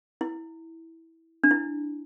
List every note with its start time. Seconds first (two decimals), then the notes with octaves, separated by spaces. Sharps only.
0.21 E4
1.44 D4
1.51 E4